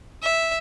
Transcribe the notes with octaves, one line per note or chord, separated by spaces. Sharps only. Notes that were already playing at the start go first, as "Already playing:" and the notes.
E5